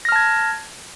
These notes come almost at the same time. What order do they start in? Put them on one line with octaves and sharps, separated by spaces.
A#6 F6 A5 G#6